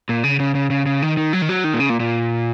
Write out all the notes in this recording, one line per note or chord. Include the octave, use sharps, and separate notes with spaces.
A#2
C#3
C#3
C#3
C#3
C#3
D#3
D#3
F#3
D#3
F#3
D#3
A#2
C#3
A#2
A#2